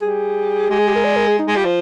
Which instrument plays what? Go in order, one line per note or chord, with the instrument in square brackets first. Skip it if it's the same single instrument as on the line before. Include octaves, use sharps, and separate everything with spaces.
[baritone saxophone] G3 [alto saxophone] G#4
[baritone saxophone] G#3 [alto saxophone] G4
[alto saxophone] G#4
G4
A#4
D5
A#4
G#4
D#4
[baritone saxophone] G#3
[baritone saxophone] G3 [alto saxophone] F4
[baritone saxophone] F3